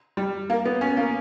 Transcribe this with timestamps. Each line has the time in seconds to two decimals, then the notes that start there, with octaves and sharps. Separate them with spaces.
0.17 G3
0.50 A#3
0.66 B3
0.81 C#4
0.97 A#3